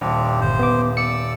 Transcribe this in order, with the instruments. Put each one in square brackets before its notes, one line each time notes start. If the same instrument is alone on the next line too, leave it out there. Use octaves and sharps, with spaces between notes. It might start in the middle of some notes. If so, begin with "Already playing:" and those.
[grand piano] D#1 [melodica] C4 D4
[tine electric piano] G1 [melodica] C5
[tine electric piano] B3 D6
[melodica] D5 E6 [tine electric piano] C#7